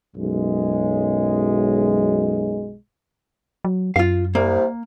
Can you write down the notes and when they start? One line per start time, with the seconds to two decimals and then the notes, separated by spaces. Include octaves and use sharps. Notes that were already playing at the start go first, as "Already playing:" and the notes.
0.16 B1 F#2 G#3
3.65 F#3
3.96 F#2 F4 F5
4.35 C2 A#3